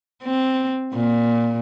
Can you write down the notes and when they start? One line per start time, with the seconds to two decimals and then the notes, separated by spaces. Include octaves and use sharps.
0.24 C4
0.94 A#2